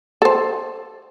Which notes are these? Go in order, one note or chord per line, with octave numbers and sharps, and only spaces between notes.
A4 C5